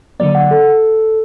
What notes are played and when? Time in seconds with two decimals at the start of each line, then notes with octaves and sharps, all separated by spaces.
0.20 D3 F#3 A#3 D5
0.35 F#5
0.51 A4